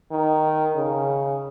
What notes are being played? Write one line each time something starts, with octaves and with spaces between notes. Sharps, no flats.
D#3
C#3